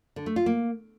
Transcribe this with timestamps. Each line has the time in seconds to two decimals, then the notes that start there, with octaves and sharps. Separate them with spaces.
0.16 D3
0.26 A3
0.36 F4
0.46 A#3